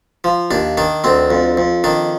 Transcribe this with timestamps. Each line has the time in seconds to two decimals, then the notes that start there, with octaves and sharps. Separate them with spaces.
0.24 F3
0.51 D#2 D4
0.77 D#3 D4
1.04 D2 C4
1.30 F2
1.57 F2
1.84 D#3 D4